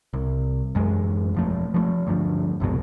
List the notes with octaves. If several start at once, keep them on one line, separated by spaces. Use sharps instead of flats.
C2
A1 F#2 G#3
E1 F3 A3
F3 F#3 A3
D2 G2 F3
F#1 C2 G#2 B2